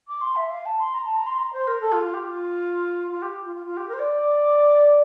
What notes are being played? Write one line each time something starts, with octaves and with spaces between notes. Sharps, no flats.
D6
C6
E5
F5
A5
C6
A#5
A5
A#5
C6
A#5
C5
A#4
A4
F4
F4
G4
F4
F4
G4
F4
F4
F4
G4
A#4
C5
D5